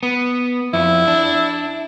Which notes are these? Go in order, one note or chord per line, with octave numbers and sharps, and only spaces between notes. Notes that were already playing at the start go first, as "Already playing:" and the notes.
B3
F2 E4
D4